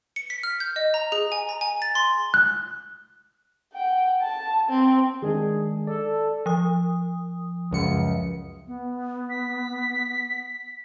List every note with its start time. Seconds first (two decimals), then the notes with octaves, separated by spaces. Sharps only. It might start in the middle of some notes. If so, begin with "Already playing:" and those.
0.16 C#7
0.30 B6
0.43 F6
0.60 G6
0.76 D#5
0.94 A#5
1.12 G#4
1.32 G#5
1.49 A#5
1.61 G#5
1.82 A6
1.95 C6
2.34 F#6
3.73 F#5 G5
4.22 A5
4.70 C4
5.22 D#3 G#3 D4 G#4
5.87 A4 D5
6.46 F3 D#6
7.71 C#2 F#2 C#7
8.67 B3
9.30 B6